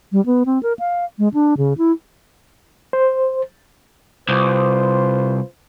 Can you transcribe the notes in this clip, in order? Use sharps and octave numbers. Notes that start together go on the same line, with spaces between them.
G3
B3
C4
A#4
F5
G#3
D4
C#3
E4
C5
C2 F4 B4 C5